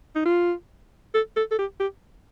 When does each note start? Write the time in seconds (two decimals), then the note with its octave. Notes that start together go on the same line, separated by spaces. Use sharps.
0.15 D#4
0.25 F4
1.14 A4
1.36 A4
1.51 A4
1.59 G4
1.80 G4